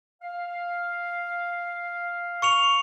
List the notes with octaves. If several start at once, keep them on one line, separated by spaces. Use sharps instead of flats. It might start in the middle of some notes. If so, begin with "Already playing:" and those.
F5
C#6 C#7 F7